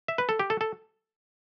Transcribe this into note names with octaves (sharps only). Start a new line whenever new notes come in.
E5
B4
A4
G4
A4
A4